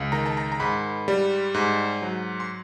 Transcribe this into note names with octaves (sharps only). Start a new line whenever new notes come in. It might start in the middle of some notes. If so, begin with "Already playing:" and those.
Already playing: C#2
D#3 A#5
A5
A#5
A#5
G#2 B5
G3
G#2
F#3
C6